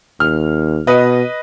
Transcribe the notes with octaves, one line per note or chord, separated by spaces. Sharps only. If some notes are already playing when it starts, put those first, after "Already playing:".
D#2 F6
B2 B4 D#5